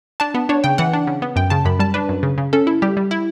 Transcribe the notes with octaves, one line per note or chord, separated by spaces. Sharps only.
D4 A5
B3
D4 C#5
C#3 G5
E3 F#5
D4
C#3
B3
F#2 G5
C#3 A5
F#2 B5
G3 A5
D4 B4
F#2
C#3
C#3
C#4 A4
E4
G3 G4
G3
E4